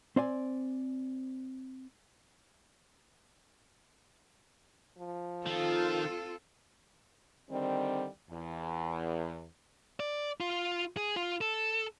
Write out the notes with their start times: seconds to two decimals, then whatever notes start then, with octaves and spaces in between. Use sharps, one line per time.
0.16 C4 C5 D5 G#5
4.98 F3
5.46 D#3 C4 F4 A4
7.50 D3 D#3 G3 C4
8.31 E2
10.00 D5
10.41 F4
10.97 G#4
11.16 F4
11.41 A4